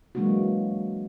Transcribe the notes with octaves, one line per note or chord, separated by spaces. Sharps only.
E3 F#3 G#3 A#3 D4 F#4